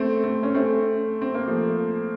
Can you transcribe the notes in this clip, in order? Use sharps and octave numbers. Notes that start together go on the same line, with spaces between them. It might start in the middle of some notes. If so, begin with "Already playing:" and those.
Already playing: A3 C4
A3 C4
C#4
A3 C4
C4
A#3
F3 A3